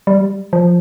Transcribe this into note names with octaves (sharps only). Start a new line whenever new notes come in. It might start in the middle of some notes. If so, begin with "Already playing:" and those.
G3
F3